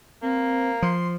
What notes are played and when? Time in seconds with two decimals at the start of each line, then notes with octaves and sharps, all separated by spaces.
0.22 A#3 C4
0.82 F3 C6